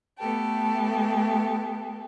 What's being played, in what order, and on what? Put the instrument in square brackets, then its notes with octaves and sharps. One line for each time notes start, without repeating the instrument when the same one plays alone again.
[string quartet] A3 B3 G4 A4